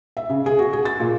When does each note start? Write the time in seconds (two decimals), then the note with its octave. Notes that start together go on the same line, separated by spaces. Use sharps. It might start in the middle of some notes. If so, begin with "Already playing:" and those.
0.17 E5
0.30 C#3
0.46 G#4
0.59 F#4
0.73 G#4
0.85 A6
1.00 A#2